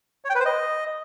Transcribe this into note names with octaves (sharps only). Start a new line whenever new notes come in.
C#5
G5
B4
C5
D#5